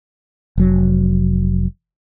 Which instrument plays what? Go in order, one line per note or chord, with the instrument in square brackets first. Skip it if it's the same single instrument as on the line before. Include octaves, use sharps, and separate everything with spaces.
[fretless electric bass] F1 F#3